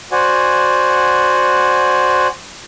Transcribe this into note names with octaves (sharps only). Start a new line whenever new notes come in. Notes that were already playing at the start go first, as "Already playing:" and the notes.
F#4 C5 D5 F#5 G#5